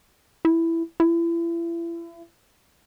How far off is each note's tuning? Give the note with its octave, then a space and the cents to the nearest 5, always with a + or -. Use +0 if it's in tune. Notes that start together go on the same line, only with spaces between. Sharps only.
E4 +5
E4 +35